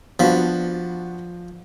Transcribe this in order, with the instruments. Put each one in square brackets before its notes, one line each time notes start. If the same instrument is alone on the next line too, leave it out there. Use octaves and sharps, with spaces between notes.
[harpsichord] F3 B5 [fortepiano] B3 D4 F#4